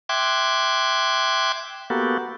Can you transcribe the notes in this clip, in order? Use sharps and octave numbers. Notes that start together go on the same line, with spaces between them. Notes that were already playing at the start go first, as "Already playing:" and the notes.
E5 G5 C6 D6 F#6 G#6
A#3 B3 F#4 G4 A4